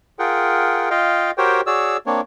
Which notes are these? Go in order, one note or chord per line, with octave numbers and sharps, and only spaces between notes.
F4 G#4 A#4 F#5 G5
F4 D#5 F5 G5
F#4 G4 A#4 C5 C#5 G5
F#4 G#4 C#5 D5 E6
A#3 C4 D4 C#5